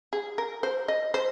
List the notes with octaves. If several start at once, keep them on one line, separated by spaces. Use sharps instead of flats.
G#4
A#4
C5
D#5
C5